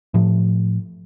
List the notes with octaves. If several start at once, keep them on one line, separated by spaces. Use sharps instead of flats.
A2 F3